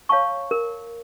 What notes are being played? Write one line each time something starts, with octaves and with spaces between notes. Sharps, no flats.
C#5 F5 A5 C#6
A#4